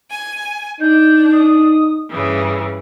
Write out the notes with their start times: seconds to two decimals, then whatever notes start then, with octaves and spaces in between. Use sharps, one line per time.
0.10 G#5
0.81 D4 D#4 G6
1.33 D#6
2.11 G2 C#3 E3 D#6